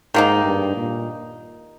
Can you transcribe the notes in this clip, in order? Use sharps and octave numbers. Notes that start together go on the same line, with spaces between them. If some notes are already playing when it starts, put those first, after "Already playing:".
G#2 D#3 A#3 D#4
G2
A#2